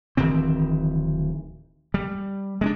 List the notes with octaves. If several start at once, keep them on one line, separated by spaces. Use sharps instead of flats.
D1 D#3 E3 C4
G3
G#3 C4 D4